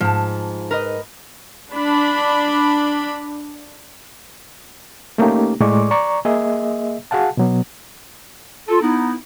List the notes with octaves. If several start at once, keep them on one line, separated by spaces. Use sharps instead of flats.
G#2 F3 A5
A#4 B4 D#5
D4 B5
A3 A#3 C#4 D#4 G4
A2 G#3 D5 C#6 D6
D5 A#5 C#6
A#3 G#4 D#5 E5
F#4 G#4 F5 F#5 A5
B2 F#3 B3
F4 A4
B3 D#4 E4